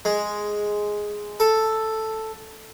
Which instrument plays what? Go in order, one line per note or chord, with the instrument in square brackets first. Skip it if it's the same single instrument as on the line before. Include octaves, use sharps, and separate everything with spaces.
[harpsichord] G#3
A4